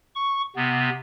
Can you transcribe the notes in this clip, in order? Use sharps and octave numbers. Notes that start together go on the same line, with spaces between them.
C#6
C3 B3